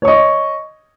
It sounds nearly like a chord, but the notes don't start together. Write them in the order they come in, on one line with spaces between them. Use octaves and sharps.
C#5 C#6 D#5